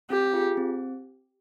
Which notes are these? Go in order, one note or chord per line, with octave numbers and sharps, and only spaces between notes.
C4 G4
F4 G#4
C4